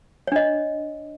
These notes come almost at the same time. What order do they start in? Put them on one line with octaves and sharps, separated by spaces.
C#5 D4 D#5